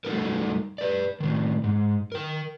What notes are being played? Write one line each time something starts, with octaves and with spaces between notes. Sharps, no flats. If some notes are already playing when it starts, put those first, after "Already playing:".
G3 A3 D#4 F#4 A4 A#4
B4 D5
A2 D#3
G#2
A#4 G5